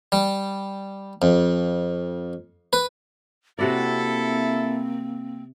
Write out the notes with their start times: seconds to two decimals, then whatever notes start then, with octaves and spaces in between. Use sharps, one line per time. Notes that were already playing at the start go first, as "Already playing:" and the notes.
0.12 G3
1.22 F2
2.73 B4
3.59 C3 A#3 C4 E4 F#4 A4 D5